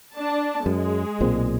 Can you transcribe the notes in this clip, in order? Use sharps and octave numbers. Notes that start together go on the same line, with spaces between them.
D4 A5
F#2 G#3
B1 A#2 C4